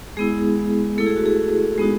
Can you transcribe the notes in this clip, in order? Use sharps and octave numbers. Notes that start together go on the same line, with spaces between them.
G#3 B3 E4 G#4
A3 E4 A4
G#4
F#4
G#4
G#3 B3 D#4 F#4 G#4